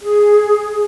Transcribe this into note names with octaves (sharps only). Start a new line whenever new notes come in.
G#4